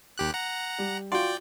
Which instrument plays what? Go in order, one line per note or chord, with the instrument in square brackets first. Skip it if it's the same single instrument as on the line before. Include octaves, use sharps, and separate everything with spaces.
[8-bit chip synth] D#2 G4 F#6
F#5 A#5
[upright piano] G3
[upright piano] F4 F#4 C6 [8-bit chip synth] D5 G5